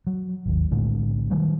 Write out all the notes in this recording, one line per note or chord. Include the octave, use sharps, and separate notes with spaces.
F#3
G#1 D#2
B1 A2 D3 G#3
D#3 F#3 G3